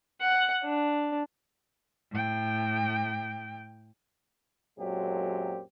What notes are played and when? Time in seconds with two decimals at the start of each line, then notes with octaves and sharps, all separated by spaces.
0.21 F#5
0.64 D4
2.11 A2 G5
4.79 F#2 A#2 F#3 G#3 C4 G4